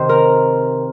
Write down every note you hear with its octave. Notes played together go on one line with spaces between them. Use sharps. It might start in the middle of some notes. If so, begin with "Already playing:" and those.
Already playing: C3 D#3 C5
A#4